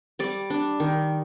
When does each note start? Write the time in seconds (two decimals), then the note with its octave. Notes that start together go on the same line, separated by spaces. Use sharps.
0.19 G3 D5
0.50 D4
0.80 D#3